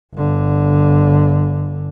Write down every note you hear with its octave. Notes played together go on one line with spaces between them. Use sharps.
G1 D3